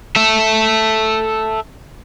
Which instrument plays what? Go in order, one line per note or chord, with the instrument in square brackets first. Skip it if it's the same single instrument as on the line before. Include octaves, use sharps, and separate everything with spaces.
[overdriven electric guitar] A4 E5